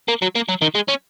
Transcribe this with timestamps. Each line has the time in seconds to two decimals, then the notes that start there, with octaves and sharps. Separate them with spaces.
0.08 A#3
0.22 F#3
0.35 A#3
0.49 F#3
0.62 D#3
0.75 G#3
0.89 C#4